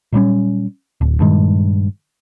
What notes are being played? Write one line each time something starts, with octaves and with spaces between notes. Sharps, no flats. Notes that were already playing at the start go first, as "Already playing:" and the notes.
A#2 F#3 G3 C#4
D1
G2 A#2 D#3 G#3